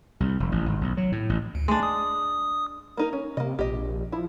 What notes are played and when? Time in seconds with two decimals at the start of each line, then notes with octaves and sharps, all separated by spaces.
0.20 C2
0.40 F1
0.52 A1
0.66 G#1
0.81 B1
0.97 F#3
1.12 A2
1.29 A1
1.55 D2
1.68 G#3 A3 D4
1.83 D#6
2.97 A#3 D#4 A#4
3.13 C#4
3.37 C3 A#3 D#5
3.59 A#1 G4 D#5
4.12 F3 E4